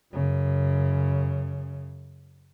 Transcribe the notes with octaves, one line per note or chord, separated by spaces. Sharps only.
F#2 C#3